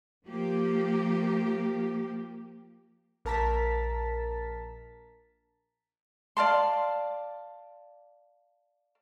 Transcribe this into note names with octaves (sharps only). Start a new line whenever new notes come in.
F3 A#3 G4
A#1 A#4 A5 A#5 A6 B6
D5 F5 A5 C6